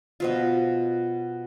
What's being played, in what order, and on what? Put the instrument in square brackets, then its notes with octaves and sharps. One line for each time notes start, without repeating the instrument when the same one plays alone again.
[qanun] B2 F3 F4